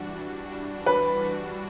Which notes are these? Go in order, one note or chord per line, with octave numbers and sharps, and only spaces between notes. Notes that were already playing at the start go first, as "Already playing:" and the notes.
Already playing: E3 G3 D4 F#4
E3
G3 D4 F#4
E3 B4
G3 D4 F#4